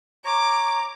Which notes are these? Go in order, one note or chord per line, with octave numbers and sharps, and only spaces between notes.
C#5 A#5 D6